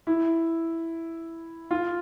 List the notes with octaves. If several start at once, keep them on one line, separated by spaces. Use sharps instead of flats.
E4
F4